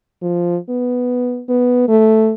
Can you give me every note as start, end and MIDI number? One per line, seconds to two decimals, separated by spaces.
0.23 0.57 53
0.70 1.43 59
1.49 1.84 59
1.88 2.34 57